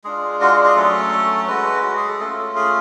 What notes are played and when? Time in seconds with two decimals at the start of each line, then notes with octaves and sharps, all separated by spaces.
0.04 G#3 D4 F4 G#4
0.41 F#4
0.52 G#4
0.64 G#4
0.76 F#3 A3 C#4 A4
1.48 G#3 C#4 F#4 B4
1.83 F#4
1.96 G#4
2.08 A4
2.20 A3 C#4 F4 A4
2.56 G#4